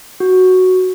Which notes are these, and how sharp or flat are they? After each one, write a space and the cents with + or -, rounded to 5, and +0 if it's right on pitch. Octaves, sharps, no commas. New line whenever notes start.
F#4 +0